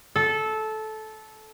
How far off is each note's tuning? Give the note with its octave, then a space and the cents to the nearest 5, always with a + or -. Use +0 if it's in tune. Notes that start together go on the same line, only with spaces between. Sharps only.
A4 -15